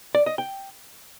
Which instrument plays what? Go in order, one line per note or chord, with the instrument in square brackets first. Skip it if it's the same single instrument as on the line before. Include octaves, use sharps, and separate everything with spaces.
[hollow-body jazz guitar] D5
D#5
G5